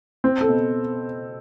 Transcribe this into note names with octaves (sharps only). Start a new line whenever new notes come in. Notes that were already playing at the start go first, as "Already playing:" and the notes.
C4
A4
B2